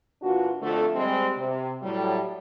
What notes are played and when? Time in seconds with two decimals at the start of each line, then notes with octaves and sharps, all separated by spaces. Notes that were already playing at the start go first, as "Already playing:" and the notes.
0.22 A#2 E3 D4 F4 F#4
0.62 F2 D3 A3
0.95 G3 G#3 C4
1.37 C3
1.82 A2 F#3 G3